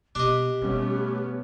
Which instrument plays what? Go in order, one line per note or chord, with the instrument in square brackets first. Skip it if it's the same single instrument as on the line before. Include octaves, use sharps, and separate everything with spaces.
[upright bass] B2 [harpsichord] D4 D#5 [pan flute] G4
[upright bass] B2 G3 [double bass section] A3 B3 C#4